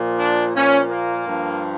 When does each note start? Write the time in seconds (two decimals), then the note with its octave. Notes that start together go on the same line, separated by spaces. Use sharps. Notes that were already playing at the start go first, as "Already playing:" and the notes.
Already playing: A#2 F3
0.19 D4
0.55 A#2 F3 C#4
0.90 A#3
1.27 G2 F3